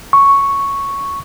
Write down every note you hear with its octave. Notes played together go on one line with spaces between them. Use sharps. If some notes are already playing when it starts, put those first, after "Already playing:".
C#6